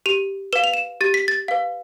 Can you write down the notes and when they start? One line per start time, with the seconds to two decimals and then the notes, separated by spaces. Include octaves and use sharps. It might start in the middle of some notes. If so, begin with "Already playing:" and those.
0.06 G4 F7
0.53 B4 F5 E7
0.64 F7
0.74 E7
1.01 G4 A6
1.14 B6
1.28 A6
1.48 B4 F5